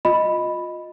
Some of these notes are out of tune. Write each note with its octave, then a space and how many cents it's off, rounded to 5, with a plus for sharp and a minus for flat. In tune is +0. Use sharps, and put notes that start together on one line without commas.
F4 +25 D#5 +0 B5 +0